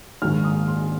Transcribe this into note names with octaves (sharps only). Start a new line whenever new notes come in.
A#1 G#2 D#3 A#3 F6
D#6
C6